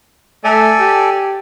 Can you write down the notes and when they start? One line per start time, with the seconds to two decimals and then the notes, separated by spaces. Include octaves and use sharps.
0.44 A3 A4 D5 G#5
0.79 G4